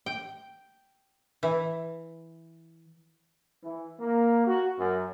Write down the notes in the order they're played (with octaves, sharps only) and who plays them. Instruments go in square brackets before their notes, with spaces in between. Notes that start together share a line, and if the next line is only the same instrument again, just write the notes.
[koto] G5
E3
[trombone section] E3
A#3
F#4
F#2